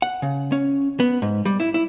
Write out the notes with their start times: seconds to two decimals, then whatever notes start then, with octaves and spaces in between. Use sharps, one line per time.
0.02 F#5
0.22 C#3
0.52 C#4
1.00 B3
1.22 G#2
1.45 G3
1.60 E4
1.74 E4